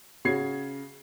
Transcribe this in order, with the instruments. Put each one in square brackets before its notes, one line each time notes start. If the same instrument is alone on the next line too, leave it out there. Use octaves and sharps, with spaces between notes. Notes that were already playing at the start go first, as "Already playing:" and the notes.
[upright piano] C#3 F#4 G#6 C7